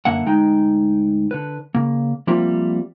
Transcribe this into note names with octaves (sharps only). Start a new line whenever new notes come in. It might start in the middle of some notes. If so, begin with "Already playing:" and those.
F#2 D3 A#3 E5 F#5
D2 G#3 D#4 G5
D3 B4
C#3 A#3
F3 G3 A#3 C4 F4 E5